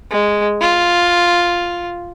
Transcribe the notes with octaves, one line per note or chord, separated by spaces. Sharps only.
G#3
F4